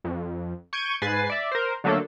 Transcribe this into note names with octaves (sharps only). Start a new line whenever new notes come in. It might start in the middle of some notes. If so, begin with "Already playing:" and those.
F2
C#6 G6 G#6 D7 D#7
G#2 B4 G#5 A6 C7
D5 E5
A#4 C5
D3 F#3 A3 A#3 D4 A4